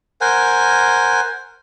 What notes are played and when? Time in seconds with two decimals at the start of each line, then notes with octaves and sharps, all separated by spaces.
0.21 A#4 C5 F#5 G#5